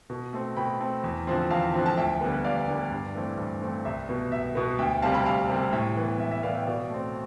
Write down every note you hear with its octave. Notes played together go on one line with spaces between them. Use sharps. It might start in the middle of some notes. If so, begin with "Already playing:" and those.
B2
A3 C4
B2 G5 B5
A3 C4
E2
D3 F3 C4
E2 F5 A5
D3 F3 C4
A5
D2 E5 G5
D3 G3 B3
D2 D5 F5
D3 G3 B3
G2
E3 A3 C4
G2
E3 A3 C4
C2 E5
B2 B3
C2 E5
B2 B3
D2 E5 G5
C3 G3 C4 F5 A5
G5 B5
D2 F5 A5
C3 G3 C4
A2 E5 G5
E3 B3
A2 E5
E5
E3 B3 D5 F5
E5 G5
B2 D5 F5
A3 C4